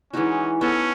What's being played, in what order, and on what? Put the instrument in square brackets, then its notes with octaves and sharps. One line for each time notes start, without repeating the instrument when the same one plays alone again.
[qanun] E3 G#3 D#4 F#4 [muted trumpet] C#4
[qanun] B3 F#4 A4 [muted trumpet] C#4